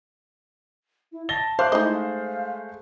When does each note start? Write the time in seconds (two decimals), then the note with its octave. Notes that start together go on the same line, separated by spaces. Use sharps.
1.12 E4
1.29 A5 A6 A#6 G7
1.59 C5 E5 F5 D6 F#6
1.72 G#3 A3 D#4 E4 D#5
1.93 F5